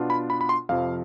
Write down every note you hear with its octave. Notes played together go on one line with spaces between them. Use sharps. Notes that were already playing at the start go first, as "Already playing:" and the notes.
Already playing: B2 B3 D4 F4
B5
B5
B5
C6
F2 C3 F3 F5